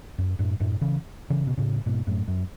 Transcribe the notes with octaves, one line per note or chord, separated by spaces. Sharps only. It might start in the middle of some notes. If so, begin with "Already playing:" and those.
F#2
F#2 A2
F#2 A2
C#3 E3
C#3 E3
B2
A2 C#3
G#2 B2
F#2 A2
F#2